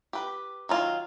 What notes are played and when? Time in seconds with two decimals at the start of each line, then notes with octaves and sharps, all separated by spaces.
0.13 G4 B4
0.69 D#3 F#3 F4